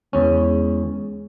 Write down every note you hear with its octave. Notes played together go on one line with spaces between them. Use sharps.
E2 G#3 C#4